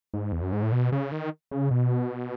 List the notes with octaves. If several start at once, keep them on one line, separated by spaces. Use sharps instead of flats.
G#2
E2
F#2
G#2
A2
B2
C#3
D#3
C#3
B2